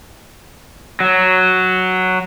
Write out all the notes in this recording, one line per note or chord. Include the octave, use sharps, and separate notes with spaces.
F#3